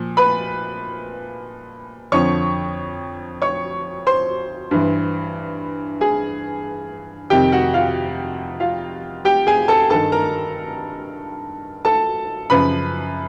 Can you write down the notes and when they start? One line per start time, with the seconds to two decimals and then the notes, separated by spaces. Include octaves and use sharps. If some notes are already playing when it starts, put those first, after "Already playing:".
Already playing: A#2 F3
0.17 B4 B5
2.12 F2 D3 F3 C#5 C#6
3.42 C#5 C#6
4.07 C5 C6
4.71 G2 E3
6.01 G#4 G#5
7.30 F2 C3 D#3 G4 G5
7.52 F#4 F#5
7.74 F4 F5
8.60 F4 F5
9.25 G4 G5
9.47 G#4 G#5
9.68 A4 A5
9.90 G2 D#3 A4 A5
10.12 A#4 A#5
11.85 A4 A5
12.50 F#2 C#3 F3 B4 B5